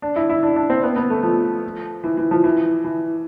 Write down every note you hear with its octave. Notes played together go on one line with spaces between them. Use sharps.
D4
E4
E4
D4
D4
C4
B3
B3
A3
F3
E3
E3
F3
E3
E3